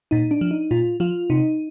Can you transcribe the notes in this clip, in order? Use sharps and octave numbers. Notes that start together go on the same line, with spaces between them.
A#2 D#4
D4
F3
D#4
A#2 F4
F3 F4
C3 D#4